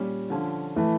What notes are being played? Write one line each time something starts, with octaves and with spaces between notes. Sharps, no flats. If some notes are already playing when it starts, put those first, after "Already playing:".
Already playing: A#2 G3 C#4
D3 F3 C#4 F4
A2 E3 A3